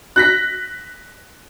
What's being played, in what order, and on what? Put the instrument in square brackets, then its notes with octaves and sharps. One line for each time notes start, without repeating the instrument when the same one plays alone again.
[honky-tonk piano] F#6 A#6 B6